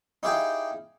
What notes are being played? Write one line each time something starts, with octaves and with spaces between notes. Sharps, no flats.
D#4 E4 G4 G#4 F5 G5